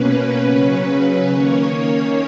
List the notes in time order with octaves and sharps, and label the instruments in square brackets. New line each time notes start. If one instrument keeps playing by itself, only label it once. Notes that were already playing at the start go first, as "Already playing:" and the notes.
Already playing: [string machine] B2 A#3 C#4 B4
C#3 F#3 C#4
D#3 A#3 C#4 C#5